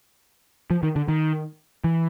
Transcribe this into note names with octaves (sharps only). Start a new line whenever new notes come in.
F3
D#3
D3
D#3
E3